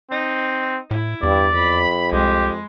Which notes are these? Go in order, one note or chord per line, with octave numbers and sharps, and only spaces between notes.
C4 D#4
A2 E4
E2 G2 D5
F2 B5
C2 G#3 G4